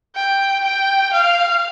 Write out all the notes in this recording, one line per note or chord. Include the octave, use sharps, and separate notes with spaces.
G5
G5
F5